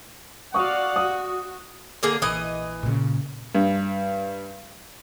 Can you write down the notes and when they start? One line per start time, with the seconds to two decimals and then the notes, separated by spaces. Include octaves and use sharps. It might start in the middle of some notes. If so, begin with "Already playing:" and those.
0.54 F#4 D5 F5 F#5 C#6 D#6
0.96 F#4 D#6
2.03 D3 A#3 G#4
2.22 A#1 E3 D#5
2.83 A#2 C#3
3.55 G2